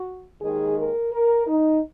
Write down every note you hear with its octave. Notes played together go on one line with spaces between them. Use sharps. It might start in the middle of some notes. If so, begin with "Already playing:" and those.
Already playing: F#4
D#2 D#3 G#3 G#4
A#4
A#4
D#4